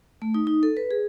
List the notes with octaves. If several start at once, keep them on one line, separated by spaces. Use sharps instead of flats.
A3
D#4
D#4
A4
B4
G#4